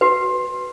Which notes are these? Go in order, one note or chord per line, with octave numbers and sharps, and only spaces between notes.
F#4 B4